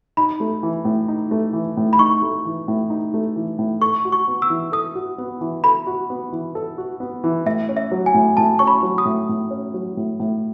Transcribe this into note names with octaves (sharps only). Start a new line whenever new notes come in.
D#4 B5
A3
E3
A2
D#4
A3
E3
A2
B5
D#4 C#6
A3
E3
A2
D#4
A3
E3
A2
A4 C#6
F#4
C#6
B3
E6
E3
A4 D#6
F#4
B3
E3
A4 B5
F#4
B3
E3
A4
F#4
B3
E3
A2 E5
C#4
E5
F#3
G#5
A2
A2 A5
C#4 C#6
B5
F#3
D#6
A2
A2
C#4
F#3
A2
A2